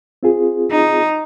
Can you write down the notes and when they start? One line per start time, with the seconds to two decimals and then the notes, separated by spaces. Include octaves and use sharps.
0.23 C4 F4 G#4
0.72 D#4